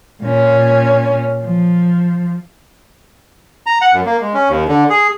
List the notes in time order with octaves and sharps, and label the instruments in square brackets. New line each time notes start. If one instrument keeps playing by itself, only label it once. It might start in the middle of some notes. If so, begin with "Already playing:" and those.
[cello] A#2 C#4
F3
[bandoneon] A#5
F#5
F#2
A#3
G#3
C#4
D#2
D3
G#4